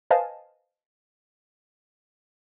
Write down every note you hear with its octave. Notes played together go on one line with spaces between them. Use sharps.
B4 C5 D#5 F5 G#5 A5